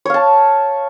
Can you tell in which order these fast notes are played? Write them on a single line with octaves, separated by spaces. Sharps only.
C#5 F5 A5